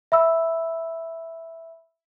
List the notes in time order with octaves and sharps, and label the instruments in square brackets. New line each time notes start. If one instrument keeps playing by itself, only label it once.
[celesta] E5 B5 E6